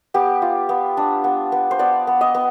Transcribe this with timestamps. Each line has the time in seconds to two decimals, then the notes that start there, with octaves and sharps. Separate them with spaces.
0.14 B3 G4
0.42 F4
0.69 B3
0.97 D4
1.24 B3
1.52 B3
1.71 C5
1.79 B3 D5
2.07 B3
2.21 D#5
2.34 B3